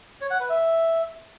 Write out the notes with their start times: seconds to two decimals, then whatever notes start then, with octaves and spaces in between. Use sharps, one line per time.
0.21 C#5
0.30 F#5
0.40 B4
0.49 E5